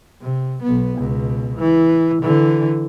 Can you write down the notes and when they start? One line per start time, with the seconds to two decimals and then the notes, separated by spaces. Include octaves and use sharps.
0.21 C3
0.63 B1 B3
0.99 C#2 B2
1.58 E3
2.22 D3 E3